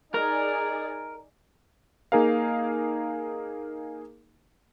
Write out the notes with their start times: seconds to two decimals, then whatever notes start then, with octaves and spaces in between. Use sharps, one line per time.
0.14 D#4 G#4 A#4 D5
2.12 A#3 D#4 G#4 A#4 F5